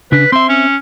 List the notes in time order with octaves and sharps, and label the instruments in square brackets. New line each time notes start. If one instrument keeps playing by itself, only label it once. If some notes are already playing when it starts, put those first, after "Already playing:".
[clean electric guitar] C#3 D4 [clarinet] B4
[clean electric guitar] C4 E5 [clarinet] C6
[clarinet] C#4